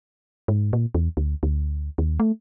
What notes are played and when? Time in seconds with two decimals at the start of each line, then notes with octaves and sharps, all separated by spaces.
0.48 G#2
0.73 A#2
0.95 E2
1.17 D2
1.43 D2
1.98 D#2
2.20 A3